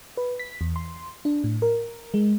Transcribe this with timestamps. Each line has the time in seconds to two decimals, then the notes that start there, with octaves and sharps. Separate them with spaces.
0.17 B4
0.39 B6
0.61 E2
0.76 C6
1.25 D4
1.44 A2
1.62 A#4
2.14 G#3